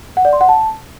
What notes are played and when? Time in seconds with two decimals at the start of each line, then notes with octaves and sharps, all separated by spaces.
0.17 F#5
0.25 D5
0.33 C6
0.41 F#5
0.49 A5